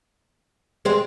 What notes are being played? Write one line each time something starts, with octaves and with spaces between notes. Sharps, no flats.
G#3 C4